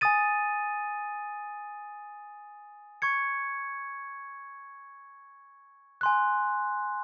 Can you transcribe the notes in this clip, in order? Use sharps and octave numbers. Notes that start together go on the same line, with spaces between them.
G#5 D#6 A6 D#7
C#6 G#6 C#7
G#5 C6 F#6